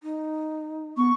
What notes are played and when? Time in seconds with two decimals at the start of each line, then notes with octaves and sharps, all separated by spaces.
0.03 D#4
0.97 B3 C#6